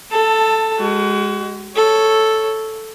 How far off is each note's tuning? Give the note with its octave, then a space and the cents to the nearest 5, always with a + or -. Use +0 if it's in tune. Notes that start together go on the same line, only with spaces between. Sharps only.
A4 +0 A5 +15
G#3 -10 F#4 +35
A4 +0 C#5 +0